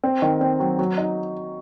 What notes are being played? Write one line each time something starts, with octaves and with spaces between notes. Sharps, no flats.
C4
D#3
C4
F#3
F#3
D#4